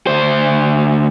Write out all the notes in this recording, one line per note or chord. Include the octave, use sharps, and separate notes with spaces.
D2 C5